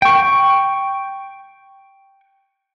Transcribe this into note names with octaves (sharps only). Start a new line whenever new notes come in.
G5 C#6